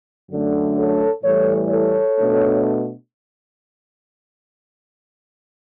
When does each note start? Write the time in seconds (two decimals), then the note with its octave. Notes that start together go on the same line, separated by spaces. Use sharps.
0.31 F#2 D3 A3 D4
0.77 A4 C#5
1.24 A2 E3 G3 A4 C#5
1.70 A4 C#5
2.18 B2 A3 D4